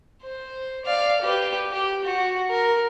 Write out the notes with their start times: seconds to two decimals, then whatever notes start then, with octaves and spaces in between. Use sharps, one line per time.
0.22 C5
0.85 D5 F5
1.22 G4 B4
1.72 G4
2.05 F#4
2.50 A#4